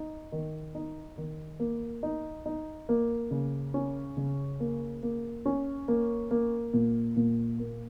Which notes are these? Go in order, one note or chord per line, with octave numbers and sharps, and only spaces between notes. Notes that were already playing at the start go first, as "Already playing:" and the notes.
Already playing: D#4
D#3
D#4
D#3
A#3
D#4
D#4
A#3
C#3
C#4
C#3
A#3
A#3
C#4
A#3
A#3
A#2
A#2
A#3